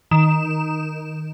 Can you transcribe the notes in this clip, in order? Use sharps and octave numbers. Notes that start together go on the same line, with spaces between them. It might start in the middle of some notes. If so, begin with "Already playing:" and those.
D#3 E7